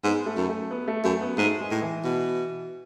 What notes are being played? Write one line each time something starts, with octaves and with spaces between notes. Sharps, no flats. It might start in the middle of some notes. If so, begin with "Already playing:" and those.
G#2 B3
A3
F#2
A3
B3
A3
F#2 A3
B3
G#2 A3
G#3
A2
E3
B2